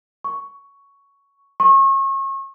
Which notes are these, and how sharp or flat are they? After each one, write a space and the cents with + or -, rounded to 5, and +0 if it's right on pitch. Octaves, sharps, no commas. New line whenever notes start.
C#6 +10
C#6 -35